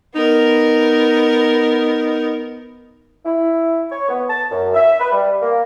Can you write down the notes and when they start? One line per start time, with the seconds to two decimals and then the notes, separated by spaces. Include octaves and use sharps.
0.15 B3 D#4 A#4
3.25 E4
3.91 C#5
4.09 B3
4.30 A5
4.51 F#2
4.75 E5
5.00 B4
5.12 G3
5.41 A#3